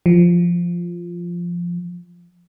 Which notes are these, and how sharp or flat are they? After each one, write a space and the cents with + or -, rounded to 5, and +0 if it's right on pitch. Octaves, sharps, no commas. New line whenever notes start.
F3 -5